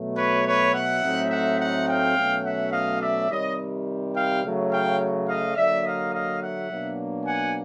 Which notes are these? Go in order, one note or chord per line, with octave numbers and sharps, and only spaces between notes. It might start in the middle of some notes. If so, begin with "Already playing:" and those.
Already playing: B2 F#3 A3
B4 C#5
B4 C#5
E5 F#5
A2 F#3 A3 C4 D#4
E5 F#5
E5 F#5
F5 G5
B2 F#3 A3 C#4
E5 F#5
D#5 F5
D5 E5
C3 D#3 G3 C#5 D#5
F5 G5
C#3 F#3 A3
F5 G5
D#5 F5
D3 F#3 A#3 D5 E5
D#5 F5
D#5 F5
E5 F#5
B2 F#3 A#3 D4
F#5 G#5